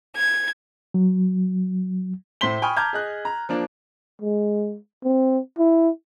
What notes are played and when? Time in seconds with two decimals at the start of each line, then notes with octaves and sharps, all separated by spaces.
0.15 G#6
0.94 F#3
2.41 A2 E4 C5 C6 B6 G7
2.62 G5 G#5 B5 C#6 D#6 F6
2.76 A5 A#5 D6 F6 G6 G#6
2.93 G#4 D#5 F#6
3.25 A#5
3.49 F3 A#3 D4
4.22 G#3
5.04 C4
5.58 E4